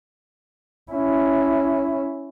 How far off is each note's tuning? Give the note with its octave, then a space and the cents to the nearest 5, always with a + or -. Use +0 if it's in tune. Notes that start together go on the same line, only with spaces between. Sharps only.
C#4 +0 E4 +0